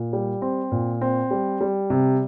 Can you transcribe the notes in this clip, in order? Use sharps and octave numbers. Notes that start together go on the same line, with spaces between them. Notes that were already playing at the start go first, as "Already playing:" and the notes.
Already playing: A#2
G3
C4
A#2
C4
G3
G3
C3